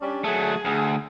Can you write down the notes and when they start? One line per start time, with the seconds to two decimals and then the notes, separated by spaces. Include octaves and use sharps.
0.01 G3 C#4 D4
0.24 F#3 A3 G#4
0.65 D2